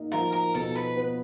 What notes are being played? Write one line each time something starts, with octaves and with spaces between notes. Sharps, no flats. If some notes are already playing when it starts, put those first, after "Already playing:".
Already playing: A#3 D#4
F3 A#4
A#4
B2 A4
B4
B3